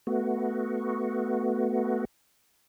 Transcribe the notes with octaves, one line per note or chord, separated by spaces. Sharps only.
A3 B3 F#4